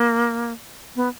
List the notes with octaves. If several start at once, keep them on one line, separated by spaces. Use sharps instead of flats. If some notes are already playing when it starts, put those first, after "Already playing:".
Already playing: A#3
B3